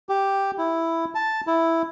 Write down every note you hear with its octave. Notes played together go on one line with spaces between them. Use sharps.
G4
E4
A5
E4